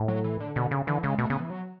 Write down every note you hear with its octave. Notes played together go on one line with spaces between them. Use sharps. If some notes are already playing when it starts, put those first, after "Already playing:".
Already playing: A2
F#3
E3
D3
B2 D3
C#3
D3 E3
C#3 G#3
B2 A3
C#3 B3
E3
F#3